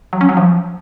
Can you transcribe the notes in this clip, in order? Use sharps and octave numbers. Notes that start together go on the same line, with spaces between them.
F#3
C#4
F#3
F3